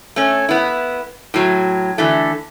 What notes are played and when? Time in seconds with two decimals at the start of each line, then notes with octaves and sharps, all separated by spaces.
0.16 A3 C#4
0.49 B3 E4
1.34 A2 F#3
1.98 D3 E3 A3